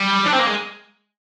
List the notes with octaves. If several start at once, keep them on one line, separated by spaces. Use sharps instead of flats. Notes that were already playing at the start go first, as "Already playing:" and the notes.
Already playing: G3
D4
C4
A#3
G#3